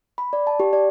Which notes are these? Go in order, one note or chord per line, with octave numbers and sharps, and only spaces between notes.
B5
D5
A5
G4
D5